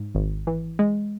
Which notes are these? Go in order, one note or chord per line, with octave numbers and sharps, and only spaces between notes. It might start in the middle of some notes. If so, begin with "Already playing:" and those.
Already playing: G#2
G#1
E3
G#3